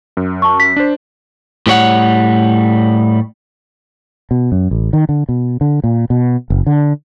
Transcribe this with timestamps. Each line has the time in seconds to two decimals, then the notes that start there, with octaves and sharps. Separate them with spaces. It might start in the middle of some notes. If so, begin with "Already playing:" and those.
0.17 F#2
0.42 A5 C#6
0.60 B6
0.76 D4 C5
1.67 A2 G3 C#5 F#5
4.31 B2
4.52 F#2
4.71 A1
4.93 D#3
5.09 D3
5.29 B2
5.61 D3
5.84 A#2
6.10 B2
6.50 F#1
6.67 D3